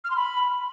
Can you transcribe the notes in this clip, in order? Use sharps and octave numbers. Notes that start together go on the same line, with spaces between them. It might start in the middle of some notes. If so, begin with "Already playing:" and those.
F6
C6
B5